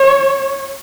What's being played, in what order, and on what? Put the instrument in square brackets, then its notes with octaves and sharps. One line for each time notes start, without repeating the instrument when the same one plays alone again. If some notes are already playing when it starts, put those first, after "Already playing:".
Already playing: [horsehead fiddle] C#5